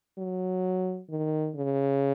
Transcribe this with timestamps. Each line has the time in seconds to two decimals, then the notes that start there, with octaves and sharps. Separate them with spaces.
0.18 F#3
1.10 D#3
1.56 C#3